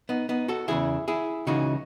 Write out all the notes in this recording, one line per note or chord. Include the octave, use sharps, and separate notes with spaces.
B3 D#4
B3 D#4
F#4 A4
E2 C#3 E3 E4 G#4
E4 G#4
C#2 C#3 E3 D#4 F#4